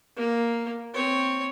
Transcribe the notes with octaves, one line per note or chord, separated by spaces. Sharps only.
A#3
C4 C#5